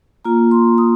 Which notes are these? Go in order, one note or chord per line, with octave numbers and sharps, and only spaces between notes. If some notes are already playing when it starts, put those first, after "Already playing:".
A#3 F4 A#5
C6
D#6